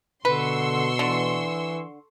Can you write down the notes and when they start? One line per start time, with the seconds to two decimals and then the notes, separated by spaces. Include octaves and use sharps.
0.25 B2 D3 B4 C6 C#6 E6
0.99 D3 E3